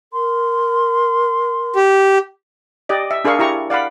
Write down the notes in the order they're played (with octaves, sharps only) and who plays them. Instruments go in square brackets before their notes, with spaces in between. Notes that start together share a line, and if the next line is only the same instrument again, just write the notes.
[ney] A#4 [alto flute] C6
[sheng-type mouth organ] G4
[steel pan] G4 D5 D#5
E5
D4 G#4 A#4 F5 C#6
E4 G4 A#5 C#6
D5 F5 F#5 B5